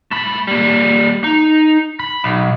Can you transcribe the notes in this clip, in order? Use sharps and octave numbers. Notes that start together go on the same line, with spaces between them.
A3 B5
G3 A#3
D#4
B5
B1